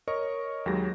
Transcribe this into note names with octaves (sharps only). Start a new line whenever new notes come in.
A#4 C#5 D#5 C#6
D#2 F#3 G#3 G4 G#4 A#6